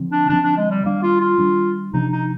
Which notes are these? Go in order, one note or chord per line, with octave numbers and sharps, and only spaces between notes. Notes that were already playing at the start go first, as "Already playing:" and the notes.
Already playing: D3 F3 C4
D4
D3 F3 C4 D4
D4
G#3
G3
D#3 G3 A#3 D4
F4
F4
D#3 G3 D4
C3 F3 A#3 D4 D#4
D#4